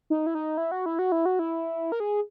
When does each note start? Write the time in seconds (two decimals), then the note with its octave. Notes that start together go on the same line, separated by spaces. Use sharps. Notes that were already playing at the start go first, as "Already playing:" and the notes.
0.10 D#4
0.26 E4
0.35 D#4
0.57 E4
0.71 F#4
0.86 E4
0.99 F#4
1.12 E4
1.26 F#4
1.39 E4
1.92 A#4
2.00 G#4